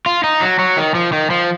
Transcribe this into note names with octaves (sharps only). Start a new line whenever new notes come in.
F4
D#4
F#3
F#3
D#3
F3
D#3
F3